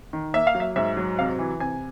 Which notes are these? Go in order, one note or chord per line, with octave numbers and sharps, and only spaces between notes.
D#3
A#3 E5
F5
F#3
E5
G#2 E5
F#3
C3 F5
E3
C3 G#5